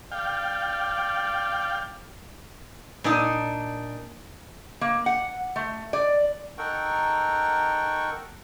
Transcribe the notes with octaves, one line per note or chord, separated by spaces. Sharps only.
D5 F5 G5
A#2 D4 D#4
A#3
F#5
A3
D5
D#4 A4 A#4 F#5 G5 C#6